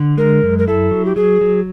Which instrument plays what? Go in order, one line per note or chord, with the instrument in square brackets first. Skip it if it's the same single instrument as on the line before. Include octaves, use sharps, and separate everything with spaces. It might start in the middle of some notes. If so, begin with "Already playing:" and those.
Already playing: [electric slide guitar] D3
[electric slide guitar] G#3 [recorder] A#4
[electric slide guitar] F#2
[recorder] A#4
[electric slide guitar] E4 [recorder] A4
[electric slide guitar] F#3
[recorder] G4
[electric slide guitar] F#3 [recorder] G#4
[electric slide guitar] F#3